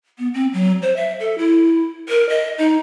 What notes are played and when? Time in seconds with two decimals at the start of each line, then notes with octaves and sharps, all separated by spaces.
0.18 B3
0.34 C4
0.53 F#3
0.82 C5
0.97 E5
1.20 A4
1.38 E4
2.09 A#4
2.29 D#5
2.58 D#4